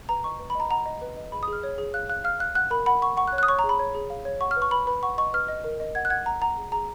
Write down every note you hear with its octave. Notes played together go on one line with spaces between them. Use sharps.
B4 A#5
D#5 C#6
B4
B5
D#5 A#5
F#5 A#5
D#5
B4
D#5
G#4 B5
D#6
G#4 F6
C#5
G#4
F5 F#6
F5 F#6
F5 F6
F5 F#6
F#5 F#6
A#4 B5
F#5 B5
F#5 C#6
F#5 C#6
F#6
C#5
F#6
D#6
C#5 C#6
A#5
G#4
B5
C#5
G#4
F5
C#5
F#5 C#6
F6
B4
C#6
B4 B5
B4 B5
F#5 C#6
D#5 C#6
B4 F6
D#5
A#4
D#5
F#5 G#6
F#6
F#5 G#6
F#5 A#5
F#5 A#5
G#4
G#4 A#5